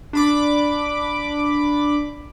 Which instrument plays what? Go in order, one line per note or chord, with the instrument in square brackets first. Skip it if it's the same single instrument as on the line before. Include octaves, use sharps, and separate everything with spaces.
[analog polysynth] D4 B5 D6